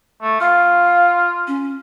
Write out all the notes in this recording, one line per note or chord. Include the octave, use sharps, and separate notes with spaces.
A3
F4 F5
C#4